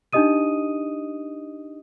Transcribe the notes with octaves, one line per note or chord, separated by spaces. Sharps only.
D4 D#4 G4 D#5 D#6 D#7